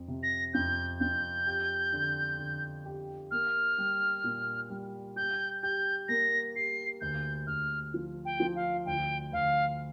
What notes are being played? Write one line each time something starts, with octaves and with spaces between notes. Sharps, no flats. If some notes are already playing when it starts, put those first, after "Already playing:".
Already playing: F2
C3
A#6
F2 G6
F2 G6
G4
D3
D3
G4
A#3 F6
G3
A#2
G3
G4 G6
G4 G6
A#3 A#6
G4 C7
D2 G6
D2 F6
F3
G5
F3
F5
D2 G5
D2 F5